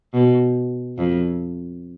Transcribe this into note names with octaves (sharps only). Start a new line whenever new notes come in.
B2
F2